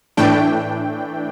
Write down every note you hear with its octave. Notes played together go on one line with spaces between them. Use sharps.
A2 E3 A3 D4 G5